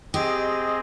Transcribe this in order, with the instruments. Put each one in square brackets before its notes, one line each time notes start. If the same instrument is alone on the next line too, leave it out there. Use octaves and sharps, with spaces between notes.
[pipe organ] C4 G#4 [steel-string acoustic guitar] G4 [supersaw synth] D#5